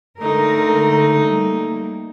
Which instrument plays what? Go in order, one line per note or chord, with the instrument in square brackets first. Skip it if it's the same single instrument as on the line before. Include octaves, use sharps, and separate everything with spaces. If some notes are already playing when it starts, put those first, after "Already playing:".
[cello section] D3 G#3 A#4 [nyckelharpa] A3 D#4
[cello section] G3 A#3